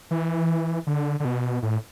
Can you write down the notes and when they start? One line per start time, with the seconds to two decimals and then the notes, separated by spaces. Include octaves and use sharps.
0.11 E3
0.87 D3
1.20 D3
1.25 B2
1.62 A2